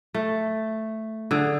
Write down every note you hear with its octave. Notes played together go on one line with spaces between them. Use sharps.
A3
D3 G#4